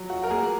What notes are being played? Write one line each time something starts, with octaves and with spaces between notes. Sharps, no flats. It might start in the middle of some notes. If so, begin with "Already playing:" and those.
Already playing: F#3
F#4
A#4
A#3 G#4